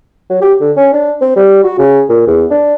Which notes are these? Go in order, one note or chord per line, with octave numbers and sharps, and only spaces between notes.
F#3
G4
D3
C#4
D4
C4
G3
F#4
C#3
A#2
E2
D4